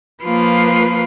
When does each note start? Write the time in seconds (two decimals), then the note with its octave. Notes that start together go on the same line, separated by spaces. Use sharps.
0.24 F3 A#3 F4 B4